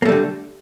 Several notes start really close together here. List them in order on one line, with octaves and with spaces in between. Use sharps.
A#3 A3 G3 D3